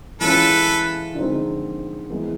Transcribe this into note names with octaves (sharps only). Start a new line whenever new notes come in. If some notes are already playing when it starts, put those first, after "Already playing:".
E3 G#3 C#4 F4 A4 B4
D3 F3 G#3 C4 D#4
E3 G#3 B3